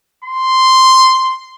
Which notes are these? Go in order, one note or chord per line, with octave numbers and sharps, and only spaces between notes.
C6